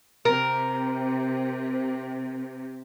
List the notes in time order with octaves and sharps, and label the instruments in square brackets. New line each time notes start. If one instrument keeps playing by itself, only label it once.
[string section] C3 [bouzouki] A#4